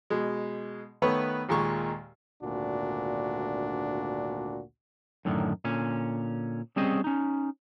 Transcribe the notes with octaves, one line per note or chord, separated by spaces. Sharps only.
B2 G#3
D#3 A3 B3 B4 C#5
D#2 A#2 G#3 C#6
G#1 D2 A#2 D4 F#4
F#2 A2 D3 D#3
A#2 D3 C#4
G3 C4 C#4 G#4 C5 D#5
C#4 D#4